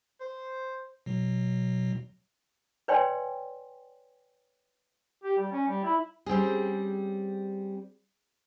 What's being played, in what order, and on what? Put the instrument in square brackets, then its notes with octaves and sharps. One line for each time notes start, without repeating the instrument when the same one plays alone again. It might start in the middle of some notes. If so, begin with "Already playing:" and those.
[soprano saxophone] C5
[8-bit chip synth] B2 F#3
[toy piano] B4 C#5 D5 G5 G#5 C6
[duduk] G4
G3
C#4
G3
E4
[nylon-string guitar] G3 C4 C#4 G#4